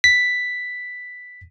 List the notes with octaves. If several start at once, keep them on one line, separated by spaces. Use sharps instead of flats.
B6